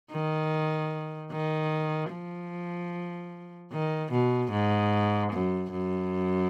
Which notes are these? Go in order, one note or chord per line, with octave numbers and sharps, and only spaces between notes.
D#3
D#3
F3
D#3
B2
G#2
F#2
F#2